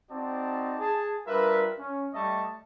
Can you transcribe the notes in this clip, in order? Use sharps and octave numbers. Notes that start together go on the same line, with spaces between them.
C4 D#4 F#4 D5 D#5 A5
G#4 A5
G3 D4 F4 A#4 B4 E5
C#4
G3 A3 D#5 E5 A5 C#6